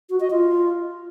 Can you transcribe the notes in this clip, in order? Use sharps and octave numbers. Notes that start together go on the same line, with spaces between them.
F#4
D#5
F4